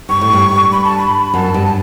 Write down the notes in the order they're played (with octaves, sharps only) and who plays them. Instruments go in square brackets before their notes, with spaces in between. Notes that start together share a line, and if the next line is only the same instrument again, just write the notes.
[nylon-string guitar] G2 [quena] C#6
[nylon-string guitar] A2
G2
[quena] B5
A5
B5
[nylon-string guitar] F#2 [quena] A5
[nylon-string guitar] G2